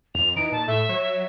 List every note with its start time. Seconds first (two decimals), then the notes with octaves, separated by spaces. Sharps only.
0.15 F2 F7
0.36 E3 D#4 D7
0.52 A#2 A5
0.68 A2 A3 E5
0.89 F#3 C#5